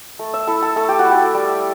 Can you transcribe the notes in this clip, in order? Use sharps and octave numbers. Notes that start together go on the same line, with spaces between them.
A3
E5
E4 A4
A4
A3 A4
G4
F#4
E4
G4
G3